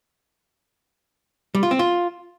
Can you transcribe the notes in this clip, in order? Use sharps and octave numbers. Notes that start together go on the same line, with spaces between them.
G3
F4
C4
F4